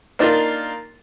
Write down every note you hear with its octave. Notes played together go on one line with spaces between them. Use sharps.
A#3 D4 D#4 F4